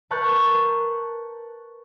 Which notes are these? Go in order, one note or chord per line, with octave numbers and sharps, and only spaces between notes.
A#4 B4 A5 C#6 F#6 G6